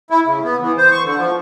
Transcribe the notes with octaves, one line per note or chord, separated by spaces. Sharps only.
E4
C#3
B3
E3
C5
C#6
D3
F3